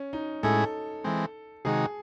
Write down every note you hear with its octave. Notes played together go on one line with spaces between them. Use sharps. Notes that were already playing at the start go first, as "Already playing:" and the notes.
Already playing: C#4
D#4
A2 G#3 C#4 E4 G#4 A4
E3 G#3 C4
C3 D#3 G#3 D#4 F#4 G#4